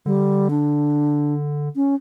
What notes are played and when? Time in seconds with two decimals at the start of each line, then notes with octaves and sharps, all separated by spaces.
0.06 D3 G3
0.50 D4
1.76 C#4